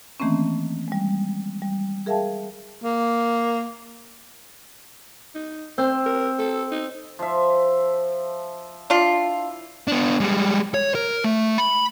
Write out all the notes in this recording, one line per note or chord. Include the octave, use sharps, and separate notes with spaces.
D#3 E3 A3 A#3 C4 C#4
G3 G#3
G3
G#4 A#4 E5 F5 G5 A5
A#3
D#4
C4 C5
A#4
A4
D#4
F3 E5
D4 E4 F4
B3 D4
G3 G#3
C#5
A#4
A3
B5